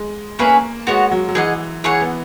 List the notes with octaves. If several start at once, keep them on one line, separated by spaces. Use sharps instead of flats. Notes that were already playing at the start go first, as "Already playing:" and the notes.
Already playing: G#3
A#3 C#4 G#4 B4 E5
G#3 B3 F#4 C#5 F#5
F#3
F#3
E3 G#4 D#5 F#5
E3 G#4 C#5 F#5
B3